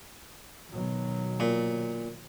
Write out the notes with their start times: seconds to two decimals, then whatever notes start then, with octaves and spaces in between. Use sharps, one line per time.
0.70 B2 D#3 F#3
1.40 A#2